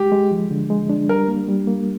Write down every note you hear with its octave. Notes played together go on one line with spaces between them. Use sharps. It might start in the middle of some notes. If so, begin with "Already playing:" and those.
Already playing: G#3 G4
G#3
F3
D3
G#3
D4
G3 A#4
A#3
G3
A#3